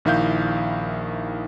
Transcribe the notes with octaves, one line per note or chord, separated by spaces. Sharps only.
A#1 D#3 E4 F5 G6